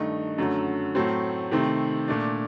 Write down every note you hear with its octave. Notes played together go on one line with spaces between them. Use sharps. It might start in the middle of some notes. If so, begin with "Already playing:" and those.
Already playing: G2 D#3 A3 D#4
F#2 D3 F#3 A3
A2 F#3 A3 C4
C3 D#3 A3 C4
A#2 A3 D4